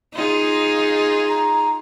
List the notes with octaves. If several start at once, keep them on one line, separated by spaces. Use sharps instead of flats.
D#4 F4 G#4
A#5